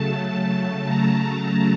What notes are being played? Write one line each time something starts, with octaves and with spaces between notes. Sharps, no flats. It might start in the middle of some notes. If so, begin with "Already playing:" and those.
Already playing: C#3 F#3 A3 A5
A#5
A5